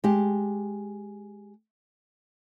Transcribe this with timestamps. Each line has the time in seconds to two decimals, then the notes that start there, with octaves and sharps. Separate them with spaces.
0.04 G#3 G4